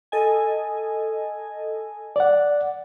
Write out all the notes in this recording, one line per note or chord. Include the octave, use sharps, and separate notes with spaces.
A4 D#5 G#5
D5 F#5